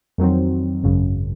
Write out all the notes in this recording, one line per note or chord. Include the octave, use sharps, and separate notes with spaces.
F2 D#3 F#3 C4
G#1 F#2 C#3